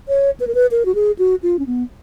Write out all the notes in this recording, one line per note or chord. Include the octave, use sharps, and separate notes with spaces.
C#5
B4
A#4
B4
A#4
F#4
G#4
F#4
F4
C#4
B3